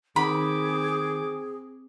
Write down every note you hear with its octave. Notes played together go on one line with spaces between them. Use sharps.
D#3 C4 G#4 B5 D6